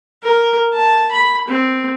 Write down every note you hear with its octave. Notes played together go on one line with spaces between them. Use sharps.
A#4
A5
B5
C4